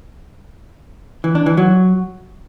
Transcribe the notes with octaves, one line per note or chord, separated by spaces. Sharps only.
E3
D4
E3
F#3